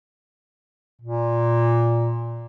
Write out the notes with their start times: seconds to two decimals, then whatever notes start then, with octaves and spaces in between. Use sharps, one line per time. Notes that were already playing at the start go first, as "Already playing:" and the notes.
1.01 A#2